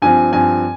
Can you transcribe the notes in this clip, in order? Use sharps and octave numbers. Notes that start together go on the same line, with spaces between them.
G2 F3 C4 G#5
G2 F3 C4 G#5